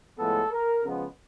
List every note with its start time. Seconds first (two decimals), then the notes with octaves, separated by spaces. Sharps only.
0.19 A2 F3 G#3 B3 A4
0.52 A#4
0.84 C#3 F3 G#3 B3